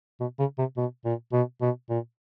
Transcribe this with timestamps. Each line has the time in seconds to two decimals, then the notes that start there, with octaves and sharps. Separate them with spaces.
0.20 B2
0.39 C#3
0.59 C3
0.77 B2
1.05 A#2
1.33 B2
1.61 B2
1.90 A#2